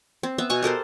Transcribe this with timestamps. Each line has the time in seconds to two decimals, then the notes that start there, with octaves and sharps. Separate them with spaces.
0.23 C4
0.38 B3 E5
0.50 B2 G#5 C#6
0.63 G4 A4 A#4 C5